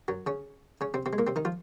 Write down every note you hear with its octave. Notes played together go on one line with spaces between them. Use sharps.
F#2 F#3
C#3 C#4
C#3 C#4
C3 C4
C3 C4
G#3
A#2 A#3
C3 C4
D#3 D#4
F3 F4